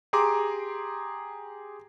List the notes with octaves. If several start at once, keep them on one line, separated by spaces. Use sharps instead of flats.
G4 G#4 A#5 C6 D6